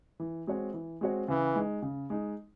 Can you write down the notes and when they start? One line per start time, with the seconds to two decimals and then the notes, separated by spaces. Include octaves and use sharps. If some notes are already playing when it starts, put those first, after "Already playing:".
0.20 E3
0.47 G#3 C4 F#4 C#5
0.74 E3
1.01 G#3 C4 F#4 C#5
1.28 C#3 E3
1.56 G#3 D#4
1.82 C#3
2.10 G#3 D#4